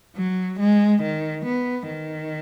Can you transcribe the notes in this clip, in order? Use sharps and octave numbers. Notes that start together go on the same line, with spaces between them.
F#3
G#3
D#3
B3
D#3